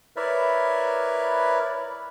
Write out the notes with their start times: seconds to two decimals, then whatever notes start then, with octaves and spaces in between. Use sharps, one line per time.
0.16 E4 A#4 B4 C#5 D5 E5